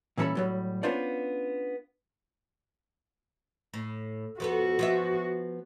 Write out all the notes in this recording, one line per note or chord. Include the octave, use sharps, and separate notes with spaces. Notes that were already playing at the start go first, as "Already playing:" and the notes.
A#2 E3 G3 C#4 A4 B5
A2 F#3 G3
B3 C#4 D4 F4 C5 D5
A2
F2 B3 F#4 A4
F3 B3 E5